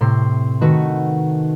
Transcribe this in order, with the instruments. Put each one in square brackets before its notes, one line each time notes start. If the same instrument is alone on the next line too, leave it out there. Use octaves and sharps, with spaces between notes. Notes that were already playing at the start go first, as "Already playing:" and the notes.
[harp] A2 C3 C6
D#3 A3 F#4 B4